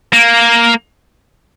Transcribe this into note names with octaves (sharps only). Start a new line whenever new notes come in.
A#3